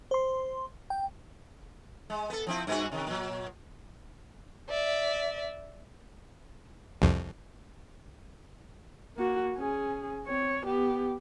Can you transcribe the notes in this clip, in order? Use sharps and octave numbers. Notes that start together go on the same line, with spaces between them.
C5 C6
G5
G#3
B3 A4
F3 C4 E4
G2 B3 F#4
C3 D#3
A#2 F#3
D5 E5
C2 F2
A#3 F#4
C#4 G#4
C4 C#5
B3 G4